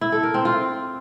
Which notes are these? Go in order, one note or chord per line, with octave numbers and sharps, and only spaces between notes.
E4
A4
A#4
C4
F4